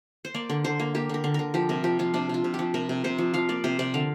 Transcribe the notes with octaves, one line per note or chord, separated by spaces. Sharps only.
C5
A#3 D5
D3
D3 C5
A#3
A#3 G4
D3 A#4
D3
D3 A#4
F3 G4
C3 A#4
F3 G4
F3 F4
C3 D4
C3 F4
C3
G4
F3
C3 A#4
C3
C3 C5
F3
F3 F5
A#3 D5
C3 C5
C3 D5
D3 F5